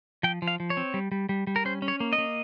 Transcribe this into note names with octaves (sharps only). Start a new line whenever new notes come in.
F3 G5
F3
F5
F3
C#5
C4
G3
G3
G3
G3
A#4
C#4 C5
C#4
C#5
A#3
D#5
A#3